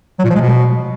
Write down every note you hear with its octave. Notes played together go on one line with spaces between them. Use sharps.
F#3
A#2
F3
G#3
B2